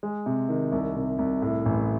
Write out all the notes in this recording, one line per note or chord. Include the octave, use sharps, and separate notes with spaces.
G#3
C3
D#3
C2
C3
C2
A2
A1